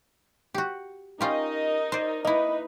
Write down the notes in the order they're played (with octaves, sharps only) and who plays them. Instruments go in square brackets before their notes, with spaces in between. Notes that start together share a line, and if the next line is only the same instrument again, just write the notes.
[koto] F#4 G4
[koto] C#4 F4 G4 [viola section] D#4 A#4 D#5
[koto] C5 D5
[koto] A#3 E4 [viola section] D#4 B4 [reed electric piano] D#5